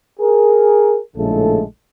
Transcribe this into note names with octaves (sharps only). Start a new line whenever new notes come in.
G#4 A#4
A#1 A2 C#3 G#3 A3 A4